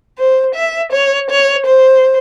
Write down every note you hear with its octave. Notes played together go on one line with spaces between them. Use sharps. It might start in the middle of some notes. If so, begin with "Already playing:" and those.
C5
E5
C#5
C#5
C5